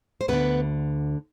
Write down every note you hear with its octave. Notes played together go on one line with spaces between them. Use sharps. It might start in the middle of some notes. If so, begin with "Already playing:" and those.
C5
D2 D3 B3 B4